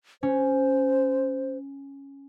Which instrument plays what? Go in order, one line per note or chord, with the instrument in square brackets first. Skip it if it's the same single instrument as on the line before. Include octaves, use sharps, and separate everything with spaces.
[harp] C#4 [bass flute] C5